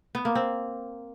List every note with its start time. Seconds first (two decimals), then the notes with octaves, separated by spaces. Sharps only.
0.15 B3
0.25 A#3
0.35 C4